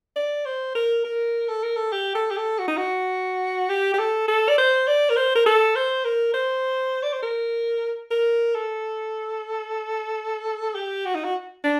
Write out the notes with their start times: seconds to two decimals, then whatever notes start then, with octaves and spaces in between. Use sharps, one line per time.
0.16 D5
0.46 C5
0.75 A#4
1.04 A#4
1.48 A4
1.63 A#4
1.76 A4
1.93 G4
2.15 A4
2.31 G4
2.37 A4
2.59 F#4
2.68 D#4
2.77 F#4
3.69 G4
3.94 G4
3.99 A4
4.28 A4
4.49 D5
4.58 C5
4.87 D5
5.10 A#4
5.16 C5
5.35 A#4
5.46 A4
5.75 C5
6.05 A#4
6.34 C5
7.03 D5
7.13 C5
7.22 A#4
8.11 A#4
8.55 A4
10.75 G4
11.05 F#4
11.15 D#4
11.24 F#4
11.64 D4